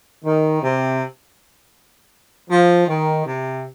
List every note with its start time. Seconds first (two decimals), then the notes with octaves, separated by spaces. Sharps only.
0.25 D#3
0.62 C3
2.50 F3
2.88 D#3
3.26 C3